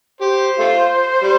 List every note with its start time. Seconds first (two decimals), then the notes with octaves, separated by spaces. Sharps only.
0.21 G4 C5
0.59 A3 F4
1.23 G3